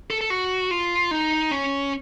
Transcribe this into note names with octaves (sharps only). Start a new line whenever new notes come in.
A4
A4
F#4
F4
D#4
C#4